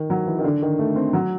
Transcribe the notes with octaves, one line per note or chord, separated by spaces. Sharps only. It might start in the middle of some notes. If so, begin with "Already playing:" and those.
Already playing: D#3
F#3
E3
D#3
D3
D#3
A3
C4
F#3